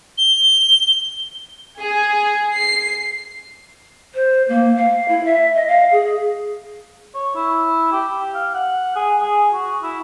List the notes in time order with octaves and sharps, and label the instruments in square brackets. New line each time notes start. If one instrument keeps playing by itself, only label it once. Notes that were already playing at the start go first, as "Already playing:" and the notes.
[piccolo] G7
[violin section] G#4
C7
[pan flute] C5
A#3
F5
E4
E5
D#5
F5
G#4
[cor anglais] C#5
E4
G4
F5
F#5
G#4
G#4
F#4
E4